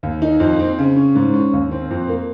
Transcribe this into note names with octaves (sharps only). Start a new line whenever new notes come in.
D#2
D#4
F2
C4
C#3
C#4
G#2
C#4
D#2
C4
F2
A#3